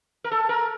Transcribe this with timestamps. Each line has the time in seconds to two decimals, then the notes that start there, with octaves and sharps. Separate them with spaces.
0.24 A#4
0.31 A4
0.49 A#4